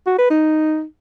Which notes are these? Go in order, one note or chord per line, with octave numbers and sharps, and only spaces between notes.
F#4
B4
D#4